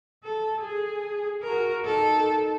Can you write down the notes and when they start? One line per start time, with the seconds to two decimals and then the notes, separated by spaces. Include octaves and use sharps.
0.24 A4
0.61 G#4
1.42 F#4 A#4
1.84 D#4 A4